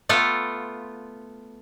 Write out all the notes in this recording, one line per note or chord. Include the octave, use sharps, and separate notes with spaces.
A3 B3 F4 A4